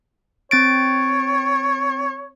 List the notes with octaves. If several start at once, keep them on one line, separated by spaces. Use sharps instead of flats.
C4 C#5 A6 D7